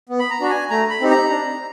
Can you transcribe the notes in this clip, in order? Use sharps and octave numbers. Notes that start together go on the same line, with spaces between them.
B3
B5
A#5
D4 F#4
G#5
A3 A#5
B5
C4 D#4 G4
A#5
D4